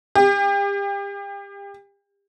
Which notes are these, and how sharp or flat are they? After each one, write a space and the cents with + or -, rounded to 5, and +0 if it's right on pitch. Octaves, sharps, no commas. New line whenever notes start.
G4 +35